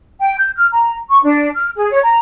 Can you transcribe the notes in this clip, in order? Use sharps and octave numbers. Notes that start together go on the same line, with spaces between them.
G5
G6
F6
A#5
C#6
D4
F6
G#4
C#5
A#5